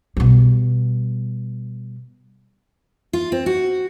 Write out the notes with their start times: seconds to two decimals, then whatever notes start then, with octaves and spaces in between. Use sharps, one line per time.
0.17 B2 G3
3.13 F4
3.32 C4
3.46 F#4